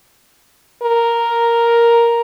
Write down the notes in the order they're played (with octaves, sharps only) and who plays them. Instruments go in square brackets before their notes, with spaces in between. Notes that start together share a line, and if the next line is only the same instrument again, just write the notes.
[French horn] A#4